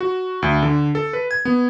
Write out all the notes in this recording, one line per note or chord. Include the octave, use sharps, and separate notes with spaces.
F#4
D2
D3
A4
B4
G#6
B3